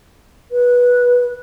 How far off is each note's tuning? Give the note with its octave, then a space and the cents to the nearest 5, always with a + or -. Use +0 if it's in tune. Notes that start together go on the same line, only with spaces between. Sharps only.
B4 -15